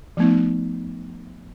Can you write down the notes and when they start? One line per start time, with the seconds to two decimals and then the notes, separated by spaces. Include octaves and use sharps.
0.17 F3 A3 B3 D#4